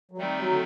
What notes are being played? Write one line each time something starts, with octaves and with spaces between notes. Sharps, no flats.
F#3
D#3 G3 A3 C4 D#4
F#3
D3